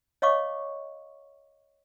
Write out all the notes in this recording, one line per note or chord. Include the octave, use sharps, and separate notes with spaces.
C#5 D#5 F5 C#6 D6